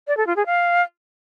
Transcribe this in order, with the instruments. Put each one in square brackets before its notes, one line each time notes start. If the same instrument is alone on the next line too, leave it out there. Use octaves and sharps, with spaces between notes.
[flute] D5
A4
F4
G#4
F5